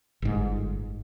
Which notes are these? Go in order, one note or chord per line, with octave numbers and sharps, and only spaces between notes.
G1 G#2